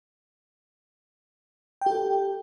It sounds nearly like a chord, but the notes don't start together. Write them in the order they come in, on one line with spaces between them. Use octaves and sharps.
G5 G4 A4